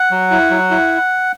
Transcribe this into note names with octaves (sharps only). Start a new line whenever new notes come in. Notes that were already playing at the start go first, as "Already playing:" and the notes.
Already playing: F#5
F#3
E4
F#3
E4